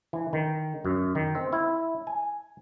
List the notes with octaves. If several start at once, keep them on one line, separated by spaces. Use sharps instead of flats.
E3
D#3
F#2
D#3
C4
E4
G#5